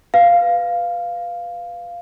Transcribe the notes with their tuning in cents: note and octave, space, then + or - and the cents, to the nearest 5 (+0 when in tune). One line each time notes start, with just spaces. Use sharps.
B4 +0 F5 +0